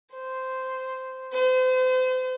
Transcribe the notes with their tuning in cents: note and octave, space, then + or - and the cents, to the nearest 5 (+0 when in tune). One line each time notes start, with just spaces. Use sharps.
C5 -10
C5 -35